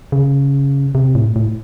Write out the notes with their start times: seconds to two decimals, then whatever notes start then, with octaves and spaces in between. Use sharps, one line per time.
0.12 C#3
0.95 C3
1.15 A2
1.36 A2